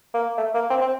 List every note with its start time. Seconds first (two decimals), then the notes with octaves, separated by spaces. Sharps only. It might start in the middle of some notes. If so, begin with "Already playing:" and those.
0.14 A#3
0.38 A3
0.55 A#3
0.70 C4
0.81 C4